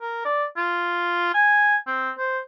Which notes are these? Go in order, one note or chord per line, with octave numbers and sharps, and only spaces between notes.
A#4
D5
F4
G#5
C4
C5